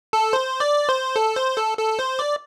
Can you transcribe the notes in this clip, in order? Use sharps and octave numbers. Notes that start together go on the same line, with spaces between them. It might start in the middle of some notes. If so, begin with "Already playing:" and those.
A4
C5
D5
C5
A4
C5
A4
A4
C5
D5